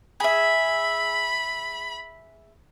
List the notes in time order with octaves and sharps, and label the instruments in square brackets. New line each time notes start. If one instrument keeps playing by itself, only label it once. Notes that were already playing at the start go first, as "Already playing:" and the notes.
[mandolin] G#4 E5 [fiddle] B5